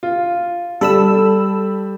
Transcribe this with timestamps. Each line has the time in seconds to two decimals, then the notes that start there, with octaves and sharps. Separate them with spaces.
0.03 F4
0.81 G3 A4 B5 E6